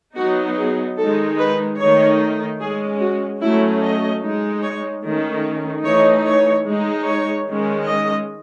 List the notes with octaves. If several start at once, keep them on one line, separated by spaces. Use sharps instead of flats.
F#3 B3 D#4 F#4
G#4
D#3 G#3 D#4 A4
B4
D#3 A3 D#4 C#5
G#3 C#4 G#4
F#4
F#3 A3 C#4 E4
D#5
G#3 D#4
C#5
D#3 A3 C#4
E3 A3 D#4 C#5
C#5
G#3 D#4
C#5
D#3 G#3 C#4
D#5